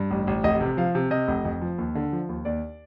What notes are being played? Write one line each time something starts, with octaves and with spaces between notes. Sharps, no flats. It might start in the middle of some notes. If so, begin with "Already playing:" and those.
Already playing: G2
A1
A1
F1 D#5
C3
F3 F5
C3
C3 D#5
F1
F2
F3
D#2
D3
F3
D#2
D#2 D5